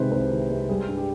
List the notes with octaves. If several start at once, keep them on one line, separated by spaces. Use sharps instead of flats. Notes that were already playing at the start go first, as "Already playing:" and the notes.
Already playing: C3 D#3 G#3 B4 C5
C2 B4
D#3
G#3
G3 G#4
G2
G4